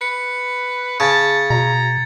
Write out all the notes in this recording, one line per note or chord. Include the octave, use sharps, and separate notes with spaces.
B4 C#7
C#3 A5 G#6 A6
B2 A#5